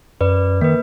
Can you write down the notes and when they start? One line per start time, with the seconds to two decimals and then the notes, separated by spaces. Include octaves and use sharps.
0.21 F#2 B4 D5
0.61 D#3 A#3 B4